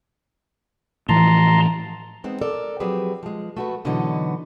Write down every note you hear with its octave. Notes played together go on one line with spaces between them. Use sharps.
A2 E3 F3 A5 A#5 C6
G#3 B3 C4 D#4
A4 A#4 D5
F3 F#3 C4 G4 G#4 B4
F3 G#3
A3 F#4 B4
B2 D3 E3 F#3 B3 D#4